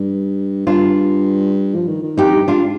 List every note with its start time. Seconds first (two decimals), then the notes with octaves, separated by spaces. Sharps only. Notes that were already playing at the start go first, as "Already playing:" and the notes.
Already playing: G2
0.67 G2 D4 F4
1.76 F3
1.88 D#3
2.03 D#3
2.17 F2 D#4 G4
2.33 G2
2.48 G#2 D4 F4